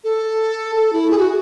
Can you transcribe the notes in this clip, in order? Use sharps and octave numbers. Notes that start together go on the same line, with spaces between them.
A4
A4
E4
G#4
F#4